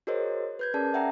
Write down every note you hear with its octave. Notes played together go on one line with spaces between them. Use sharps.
F#4 G#4 A#4 C5 C#5 D#5
B4 G6 G#6
C#4 G#4 A#4 D5 A5
E5 F#5 G5 A#5